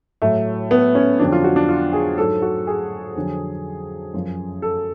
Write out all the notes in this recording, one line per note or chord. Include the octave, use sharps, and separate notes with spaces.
A2 F#3 A3
B3
C#4
F2 D3 F#3 D4
F4
F#4
D4
F4
G#4
G#2 F#3 A4
F#4
G#4
F2 D3 F#3
F#2 F3
A4